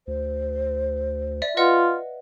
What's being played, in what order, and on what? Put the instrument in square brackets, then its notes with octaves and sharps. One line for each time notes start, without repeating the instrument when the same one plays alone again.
[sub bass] D2 [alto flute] C5
[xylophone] D5 E5
[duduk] F4 [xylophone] B4 D#5 F#5